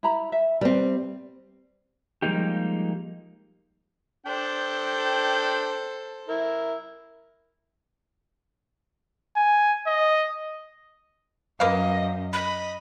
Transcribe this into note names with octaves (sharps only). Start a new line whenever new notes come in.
E4 A#5 B5
E5
G3 C4 B4
F3 G3 G#3 A#3 D#4 G4
D4 A4 C5 G5
E4 A#4
G#5
D#5
F#2 A#3 B4 D#5 F5
D#5 B5